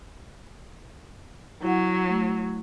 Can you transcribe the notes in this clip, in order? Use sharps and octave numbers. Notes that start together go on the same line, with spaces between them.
F#3 E4 F#5
A3